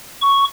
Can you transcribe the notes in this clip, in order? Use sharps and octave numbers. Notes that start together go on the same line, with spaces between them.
C#6